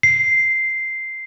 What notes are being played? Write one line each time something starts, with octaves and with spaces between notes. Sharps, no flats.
C7